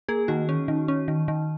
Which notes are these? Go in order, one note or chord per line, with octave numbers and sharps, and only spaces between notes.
A#3 G#4
D#3 F#4
C#4
D#3
C#4
D#3
D#3